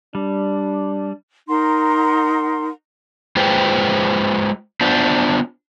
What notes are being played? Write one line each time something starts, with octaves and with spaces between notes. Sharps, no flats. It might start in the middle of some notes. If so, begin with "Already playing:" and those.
G3 D4
D#4 A#4 F#5 C6
G#3 F4 G#4 B4 C5 G5
B3 D4 F4 C5 E5